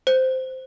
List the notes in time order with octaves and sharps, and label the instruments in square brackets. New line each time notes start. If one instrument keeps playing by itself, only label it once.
[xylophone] C5